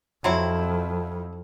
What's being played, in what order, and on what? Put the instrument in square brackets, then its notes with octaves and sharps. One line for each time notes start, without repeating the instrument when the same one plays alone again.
[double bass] F2 [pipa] F#3 C4 E4